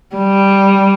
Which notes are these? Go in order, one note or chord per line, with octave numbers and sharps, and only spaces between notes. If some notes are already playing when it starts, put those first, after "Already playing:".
G3